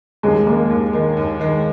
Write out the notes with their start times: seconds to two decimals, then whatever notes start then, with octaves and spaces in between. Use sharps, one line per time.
0.23 D#2 G#3
0.46 D#3 G#3 A#3
0.69 D#2
0.93 D#3 G#3
1.17 D#2
1.40 D#3 G#3